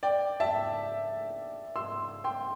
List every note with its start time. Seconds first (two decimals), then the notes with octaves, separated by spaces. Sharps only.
0.03 D5 G5
0.40 E5 A5
1.76 C6 E6
2.24 G5 C6